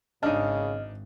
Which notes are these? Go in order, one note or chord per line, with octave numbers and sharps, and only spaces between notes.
G#1 C#3 D4 D#4 D#5 F6